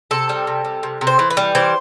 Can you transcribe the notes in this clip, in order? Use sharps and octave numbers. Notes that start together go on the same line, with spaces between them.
C3 A4
G3
C3
G3
C3
C3
C5
E3
B4
G3
E3 C5